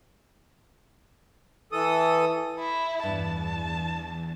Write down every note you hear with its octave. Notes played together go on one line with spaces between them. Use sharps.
E3 A4 D#6
E4
E2 G2 A5